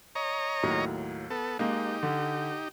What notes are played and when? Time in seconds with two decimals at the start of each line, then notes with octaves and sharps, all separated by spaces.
0.15 C#5 D#5 A#5
0.63 D#2 A2 F#3
1.30 B3 A4
1.59 G#3 A#3 D#4 G4
2.03 D3